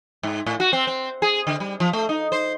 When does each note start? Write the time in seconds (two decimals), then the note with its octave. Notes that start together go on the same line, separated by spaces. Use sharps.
0.23 G#2
0.46 A2
0.60 F#4
0.73 C4
0.87 C4
1.22 G#4
1.47 D3
1.60 G3
1.80 F3
1.93 A3
2.09 D#4
2.32 C5